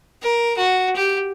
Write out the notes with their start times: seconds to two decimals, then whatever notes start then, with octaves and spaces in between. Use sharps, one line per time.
0.23 A#4
0.57 F#4
0.96 G4